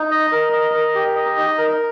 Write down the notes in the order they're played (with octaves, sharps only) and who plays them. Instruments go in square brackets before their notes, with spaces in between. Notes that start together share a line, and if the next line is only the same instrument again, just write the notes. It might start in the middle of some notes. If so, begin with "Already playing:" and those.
Already playing: [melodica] D#4
D#5
A#4
D#5
A#4
G4
D#5
D#4
A#4